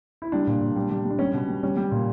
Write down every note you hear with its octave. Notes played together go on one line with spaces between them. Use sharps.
E4
G3 D4
A#2
A#2
G3
G3
G3
D4
G3 C#4
B2
G3
G3 C#4
G3
A#2